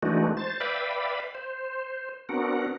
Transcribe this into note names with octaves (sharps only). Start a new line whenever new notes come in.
E3 G#3 A3 D4 D#4 F#4
C5 A6
B4 D5 E5 F5 G5 B5
C5
B3 C4 D4 F#4 A#4 F#5